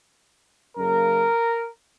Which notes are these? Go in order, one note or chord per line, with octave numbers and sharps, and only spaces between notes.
F#2 C#3 A#3 A#4